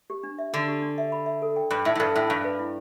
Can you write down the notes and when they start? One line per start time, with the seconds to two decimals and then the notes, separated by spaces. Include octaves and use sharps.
0.10 G4
0.23 D4
0.39 E5
0.53 D3 D4
0.68 G4
0.82 D4
0.98 E5
1.12 B5
1.26 E5
1.42 A4
1.56 G5
1.70 G2 B5
1.85 A2 E5
1.95 A2
2.00 G2 A4
2.14 A2 G5
2.29 G2 A5
2.44 B4
2.59 E4